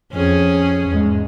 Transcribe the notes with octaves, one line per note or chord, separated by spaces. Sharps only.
F2 C#4 G#4
E2 G#2 G#3